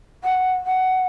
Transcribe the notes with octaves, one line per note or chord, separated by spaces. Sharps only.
F#5
F#5